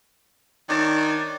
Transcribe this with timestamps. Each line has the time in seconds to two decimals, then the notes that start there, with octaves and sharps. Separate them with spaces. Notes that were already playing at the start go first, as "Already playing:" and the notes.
0.69 D#3 D4 C#5 A5